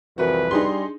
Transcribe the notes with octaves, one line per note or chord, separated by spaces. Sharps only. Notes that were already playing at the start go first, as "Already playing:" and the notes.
C2 F2 E3 F#4 A#4 B4
G3 D4 D#4 G#4 C6